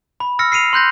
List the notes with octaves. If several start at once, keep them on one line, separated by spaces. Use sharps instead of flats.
B5
E6 F6 A#6 C#7
C7 C#7 D#7 F7
C6 F#6 G6 A#6